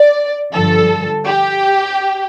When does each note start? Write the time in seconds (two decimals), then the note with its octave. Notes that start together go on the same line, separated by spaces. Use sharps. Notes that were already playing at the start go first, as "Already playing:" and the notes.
Already playing: D5
0.53 G2 D3 F3 A4
1.27 G4